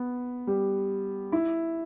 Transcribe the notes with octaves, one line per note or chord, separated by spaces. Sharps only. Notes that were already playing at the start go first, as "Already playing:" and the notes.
Already playing: B3
G3
E4